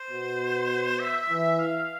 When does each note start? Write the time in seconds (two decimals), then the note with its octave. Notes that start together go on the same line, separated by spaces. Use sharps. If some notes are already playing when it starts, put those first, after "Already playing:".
Already playing: C5
0.10 B2
0.99 E5
1.30 E3
1.59 F5